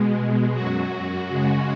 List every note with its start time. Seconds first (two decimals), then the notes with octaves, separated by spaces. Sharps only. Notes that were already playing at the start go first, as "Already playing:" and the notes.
Already playing: B2 G#3
0.53 F#2 F#3 F#4
1.29 F#2 C#3 G#3